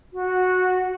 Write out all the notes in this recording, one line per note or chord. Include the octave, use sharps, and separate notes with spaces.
F#4